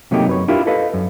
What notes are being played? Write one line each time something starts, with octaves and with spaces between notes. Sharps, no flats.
C3 F#3 A3 A#3 D#4 G4
F#2 B4 C#5
D4 E4 F4 G4 A#4
A4 B4 D#5 F5
F#2